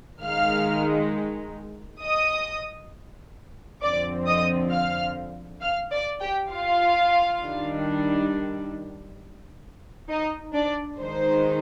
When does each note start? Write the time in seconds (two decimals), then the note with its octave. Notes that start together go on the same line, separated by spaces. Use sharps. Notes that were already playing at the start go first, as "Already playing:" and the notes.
0.23 D#3 G#3 D#4 F5 F6
2.03 D#5 D#6
3.82 F2 D3 F3 C4 D5 D6
4.27 D#5 D#6
4.72 F5 F6
5.61 F5 F6
5.91 D5 D6
6.21 G4 G5
6.51 F4 F5
7.41 D#3 G3 D4
10.10 D#4 D#5
10.54 D4 D5
10.99 D#3 G#3 D#4 C5